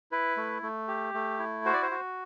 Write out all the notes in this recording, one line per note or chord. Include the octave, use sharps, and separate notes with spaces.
E4 B4
A3
A3
G4
A3
E4
F#4 C5
D5
C5
F#4